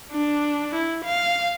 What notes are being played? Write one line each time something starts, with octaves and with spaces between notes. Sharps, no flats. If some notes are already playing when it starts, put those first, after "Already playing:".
D4
E4
F5